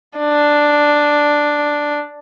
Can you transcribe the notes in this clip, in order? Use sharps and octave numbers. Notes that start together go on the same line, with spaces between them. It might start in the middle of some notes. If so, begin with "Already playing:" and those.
D4